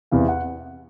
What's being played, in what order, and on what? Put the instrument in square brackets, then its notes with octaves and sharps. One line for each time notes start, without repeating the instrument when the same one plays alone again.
[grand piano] E2 C3 E3 F5
F#5